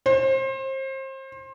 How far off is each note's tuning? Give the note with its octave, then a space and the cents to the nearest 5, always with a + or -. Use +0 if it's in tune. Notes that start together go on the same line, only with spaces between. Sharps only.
C5 +30